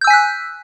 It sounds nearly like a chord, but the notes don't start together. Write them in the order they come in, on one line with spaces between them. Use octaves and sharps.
G6 E6 G#5 B6 F#6